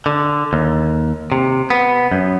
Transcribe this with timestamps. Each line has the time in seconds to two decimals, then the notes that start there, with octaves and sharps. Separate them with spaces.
0.06 D3
0.53 D#2
1.32 C3
1.70 B3
2.12 F#2